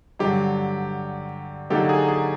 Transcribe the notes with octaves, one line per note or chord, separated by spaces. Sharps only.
G2 D3 F#3 G4
D3 F#3 A#3 D#4 F#4 G4 A4
G#4
G#4